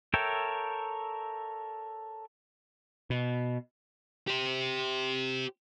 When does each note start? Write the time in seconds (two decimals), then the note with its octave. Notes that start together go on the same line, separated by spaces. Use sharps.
0.14 A4 A#4 C#5 E5 G5
3.10 B2
4.28 G4 C5